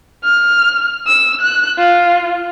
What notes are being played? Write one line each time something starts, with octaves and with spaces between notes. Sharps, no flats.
F6
E6
F#6
F4